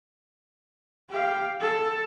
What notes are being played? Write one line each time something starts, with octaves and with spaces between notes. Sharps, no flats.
G4 F5
A4